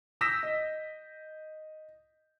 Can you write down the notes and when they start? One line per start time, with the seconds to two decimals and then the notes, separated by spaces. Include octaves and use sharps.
0.21 D#6 E6 G6 A#6 B6 E7
0.43 D#5